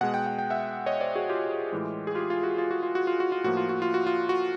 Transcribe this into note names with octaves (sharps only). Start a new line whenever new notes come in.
B2 G#3 F#5
G5
F#5
G5
E5 F#5
C#5 D#5
C5 D5
F#4 G#4
F4 G4
A2 E3 G#3
G#4
F4 G4
F4
F#4
F4
F#4
F4
F#4
F4
F#4
F4
A2 F3 A#3 F#4
F4
F#4
F4
F#4
F4
F#4